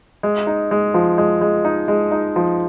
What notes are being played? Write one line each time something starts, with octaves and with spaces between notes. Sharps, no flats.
G#3
D#4
G#3
F3
G#3
G#3
D#4
G#3
D#4
F3